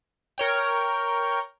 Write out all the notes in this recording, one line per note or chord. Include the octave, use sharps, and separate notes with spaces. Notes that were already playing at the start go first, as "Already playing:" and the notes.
A#4 C#5 G5